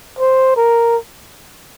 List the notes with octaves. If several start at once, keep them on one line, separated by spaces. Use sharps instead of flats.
C5
A#4